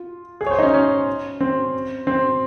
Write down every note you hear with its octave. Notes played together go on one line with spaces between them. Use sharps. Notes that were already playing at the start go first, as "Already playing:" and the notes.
Already playing: F4
G#4
C#5
C5
D#4
C#4
C#4
C4
C4